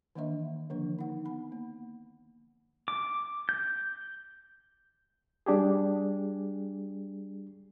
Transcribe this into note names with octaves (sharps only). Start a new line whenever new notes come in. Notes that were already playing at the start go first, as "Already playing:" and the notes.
D#3 E3 A#3 D4 D#5 E5
D3 E3 F3 A#3 D4
D#4 F#5
B3 B5
A#3
D6
G6
G3 D4 G4 G#4